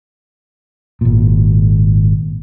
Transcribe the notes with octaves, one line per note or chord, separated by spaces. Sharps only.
G#1 A#2